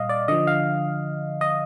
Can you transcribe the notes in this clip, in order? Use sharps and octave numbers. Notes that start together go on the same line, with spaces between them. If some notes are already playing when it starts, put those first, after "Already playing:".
Already playing: A#2 G3 D#5 F5
D5
D3 F3 D#5
F5
D#5